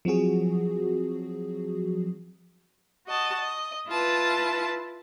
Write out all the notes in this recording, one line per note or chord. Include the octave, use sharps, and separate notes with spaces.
F3 F#3 C4 F#4 G#4
F#4 D#5 A5
D#5
E4 F4 B4 A5